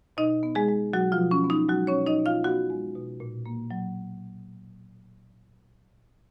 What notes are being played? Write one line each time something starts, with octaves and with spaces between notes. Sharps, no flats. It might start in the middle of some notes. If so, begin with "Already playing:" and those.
B2 D#4 D#5
B3
G#3 G#4
G#3
B2 F#3 F#4
F3 F4
B2
C#4
B3
D#4
F#3 G#3 F#4
C#4 C#5
B2
D#4 D#5
B2
F4 F5
B3 F#4 F#5
G#3
B2
A#2
A#3
F#3